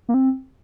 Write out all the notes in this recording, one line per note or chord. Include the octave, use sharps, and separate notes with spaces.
A#3
C4